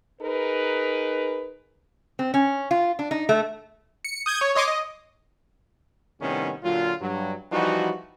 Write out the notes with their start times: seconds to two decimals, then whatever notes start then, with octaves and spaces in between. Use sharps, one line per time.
0.22 D#4 G#4 A#4 B4
2.19 C4
2.34 C#4
2.71 F4
2.99 D4
3.11 D#4
3.29 A3
4.05 C#7
4.26 D#6 G6 G#6
4.41 C#5
4.55 C#5 D#5 C6 D6
4.68 D#5
6.20 A2 C3 D#3 G3 B3 C#4
6.63 A#2 D3 F#3 F4
7.01 G2 F#3
7.52 E3 F3 G3 D#4 F#4